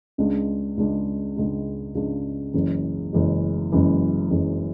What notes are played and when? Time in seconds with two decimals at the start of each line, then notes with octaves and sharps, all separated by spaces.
0.18 C#2 C#3 G#3 D4
0.77 C#2 C#3 G#3 D4
1.36 C#2 C#3 G#3 D4
1.95 C#2 C#3 G#3 D4
2.54 F#1 F#2 E3 G#3
3.13 F#1 F#2 E3 G#3
3.72 F#1 F#2 E3 G#3
4.31 F#1 F#2 E3 G#3